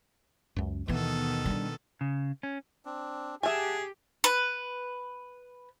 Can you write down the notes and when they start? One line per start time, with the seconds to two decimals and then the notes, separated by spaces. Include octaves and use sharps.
0.56 C#2 F#2
0.88 D#2 B2 D#3 E3 B3 A4
1.46 G3 D4
2.01 C#3
2.43 C#4
2.85 C4 D4
3.43 G4 G#4 E5 F#5 G#5 A5
4.24 B4